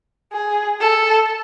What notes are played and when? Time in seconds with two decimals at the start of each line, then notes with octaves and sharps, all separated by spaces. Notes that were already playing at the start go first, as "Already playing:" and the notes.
0.33 G#4
0.80 A4